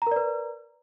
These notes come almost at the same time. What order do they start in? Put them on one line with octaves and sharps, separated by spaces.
A#5 A#4 D5 B4